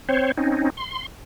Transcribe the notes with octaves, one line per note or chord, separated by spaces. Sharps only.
C4 C5 C#5
C4 C#4 D#4
C6